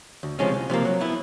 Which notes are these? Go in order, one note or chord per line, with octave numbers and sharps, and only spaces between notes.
D2
C3 F3 G#3 C#4
C2
C3 F3 A#3
F#3
B3 E4